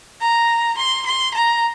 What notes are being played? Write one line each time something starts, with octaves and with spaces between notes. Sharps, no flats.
A#5
C6
C6
A#5